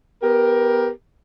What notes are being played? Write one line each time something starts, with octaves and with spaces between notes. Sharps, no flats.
B3 G4 A#4